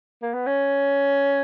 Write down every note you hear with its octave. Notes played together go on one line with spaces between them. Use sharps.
A#3
B3
C#4